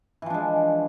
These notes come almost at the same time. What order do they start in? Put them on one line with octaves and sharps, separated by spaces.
E3 F3 D4 G#3